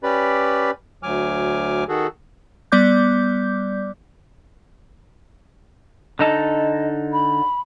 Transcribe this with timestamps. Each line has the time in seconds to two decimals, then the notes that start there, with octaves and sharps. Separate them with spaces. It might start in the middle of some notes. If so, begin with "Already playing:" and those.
0.03 C#4 G4 B4 D5 B5
1.03 D2 F#3 G#5 D6 F6
1.89 D#3 F#4 G#4 A4
2.72 G3 B3 D5 D6 G6
6.19 D3 D#4 A4 D#5
7.13 B5